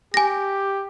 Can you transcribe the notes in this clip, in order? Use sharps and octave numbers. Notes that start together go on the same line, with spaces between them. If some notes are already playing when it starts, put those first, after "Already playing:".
G4 G#5 A#6